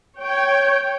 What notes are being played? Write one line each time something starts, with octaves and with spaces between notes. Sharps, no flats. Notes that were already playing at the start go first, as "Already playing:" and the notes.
C#5 G5